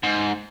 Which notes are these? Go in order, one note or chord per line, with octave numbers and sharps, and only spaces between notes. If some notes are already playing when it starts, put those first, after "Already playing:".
G#2